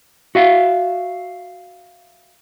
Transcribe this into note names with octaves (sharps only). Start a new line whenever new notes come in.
F#4 E5 F5